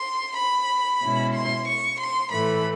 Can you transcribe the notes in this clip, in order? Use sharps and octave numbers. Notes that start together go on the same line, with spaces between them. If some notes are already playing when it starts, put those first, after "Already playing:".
Already playing: C6
B5
B2 G#3 C#4 E4
C6
C#6
C6
A2 E3 A3 B5